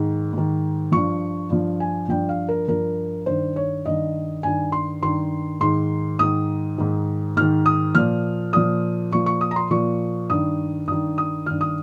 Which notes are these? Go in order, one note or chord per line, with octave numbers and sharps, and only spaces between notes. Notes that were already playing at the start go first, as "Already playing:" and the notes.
Already playing: G#2 D#3
G#2 D#3
G2 F3 C#6
G2 F3
G#5
G2 F3 G5
F5
A#4
G2 F3 A#4
G2 D#3 C5
C#5
G2 D#3 D#5
G2 D#3 G#5
C6
G2 D#3 C6
G#2 D#3 C6
G#2 D#3 D#6
G#2 D#3
G#2 D#3 F6
D#6
A#2 F3 F6
A#2 F3 D#6
A#2 F3 C#6
C#6
D#6
A#5
C6
A#2 F3 C#6
G2 D#3 D#6
G2 D#3 D#6
D#6
G2 D#3 F6
D#6